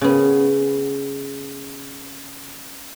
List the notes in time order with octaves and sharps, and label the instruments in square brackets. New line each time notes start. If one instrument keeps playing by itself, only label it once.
[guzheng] C#3 B3